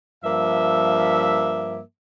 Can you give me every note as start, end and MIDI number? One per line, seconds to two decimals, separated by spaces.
0.24 1.79 43
0.24 1.79 53
0.24 1.79 58
0.24 1.79 76